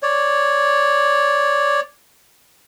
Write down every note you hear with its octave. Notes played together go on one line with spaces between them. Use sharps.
C#5 D5